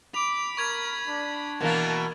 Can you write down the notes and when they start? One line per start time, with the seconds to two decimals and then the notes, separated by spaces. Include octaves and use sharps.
0.14 B5 D6 F7
0.57 A#4 C#6 G#6 F7
1.07 D4
1.61 B2 E3 A#3 A#4 A5